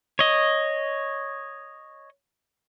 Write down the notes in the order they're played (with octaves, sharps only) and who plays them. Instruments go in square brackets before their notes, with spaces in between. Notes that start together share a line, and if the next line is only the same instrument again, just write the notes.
[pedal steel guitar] C#5 D#5